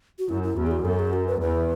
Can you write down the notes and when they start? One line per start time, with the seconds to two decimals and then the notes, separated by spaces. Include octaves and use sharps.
0.19 F#4
0.29 F#2 E4
0.43 E4
0.56 E2 F#4
0.67 G#4
0.71 F#4
0.85 F#2 A4
0.99 G#4
1.13 F#4
1.27 B4
1.41 E2 B4